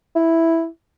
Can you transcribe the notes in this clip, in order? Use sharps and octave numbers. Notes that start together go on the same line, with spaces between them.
E4